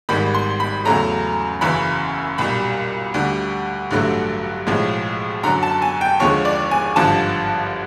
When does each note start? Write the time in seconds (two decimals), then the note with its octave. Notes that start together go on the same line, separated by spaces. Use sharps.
0.09 G#1 G#2 D#3 G3 B5
0.34 C6
0.60 B5
0.85 E2 C#3 F#3 A3 A#5
1.61 F#1 F#2 C#3 E3 B5
2.38 B1 A#2 G3 B5
3.14 D2 D3 G3
3.91 A1 G2 D3 F#3 A3
4.67 B1 A2 F3 G#3
5.43 F#2 D3 F#3 A#5
5.63 A5
5.82 G#5
6.01 G5
6.20 D#2 D3 F3 G#3 C#5
6.45 D5
6.71 G#5
6.96 G#1 G2 D3 F3 A5